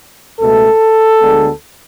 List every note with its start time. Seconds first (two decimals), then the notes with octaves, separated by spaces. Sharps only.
0.40 C#2 B2 A3 A4
1.20 D2 D3 G#3 B3